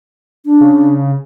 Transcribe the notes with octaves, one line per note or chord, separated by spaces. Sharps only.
D4
C#3